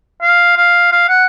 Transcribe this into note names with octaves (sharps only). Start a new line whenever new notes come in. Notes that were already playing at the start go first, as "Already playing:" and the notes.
F5
F5
F5
F#5